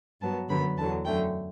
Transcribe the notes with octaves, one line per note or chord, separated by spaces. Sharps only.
G2 F#3 B3 A5
F#2 D3 F#3 B3 B5
E2 D3 F#3 A5
F#2 D3 A3 G5